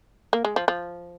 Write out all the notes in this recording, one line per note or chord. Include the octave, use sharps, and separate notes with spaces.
A#3
G#3
F3
F3